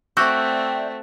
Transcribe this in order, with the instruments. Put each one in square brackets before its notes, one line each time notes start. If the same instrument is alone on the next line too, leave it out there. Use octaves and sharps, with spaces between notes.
[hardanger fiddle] A3 C4 [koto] F#4 [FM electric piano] D5 E5 G5